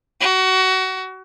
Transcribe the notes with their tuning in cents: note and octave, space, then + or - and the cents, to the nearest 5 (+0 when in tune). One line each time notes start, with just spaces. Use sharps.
F#4 +25